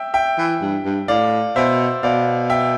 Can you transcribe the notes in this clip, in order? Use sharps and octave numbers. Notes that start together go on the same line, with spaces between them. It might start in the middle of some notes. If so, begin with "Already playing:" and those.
Already playing: E5 G5
E5 G5
E3
G2
G2
A2 D5 F5
B2 C5 E5
B2 D5 F5
E5 G5